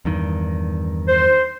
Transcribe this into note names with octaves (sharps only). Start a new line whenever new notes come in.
E2 G2 D#3
C5